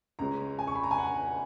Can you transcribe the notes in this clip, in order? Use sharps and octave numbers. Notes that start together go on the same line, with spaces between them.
C#2 C#3 G#3 C#4 A#5
G#5
C#6
B5
A#5
G#5
F#5